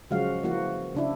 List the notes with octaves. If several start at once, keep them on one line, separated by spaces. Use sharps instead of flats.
C#3 F3 F#3 G#3 F#4 F5
E3 F3 A#3 F#4
C#3 D4 E4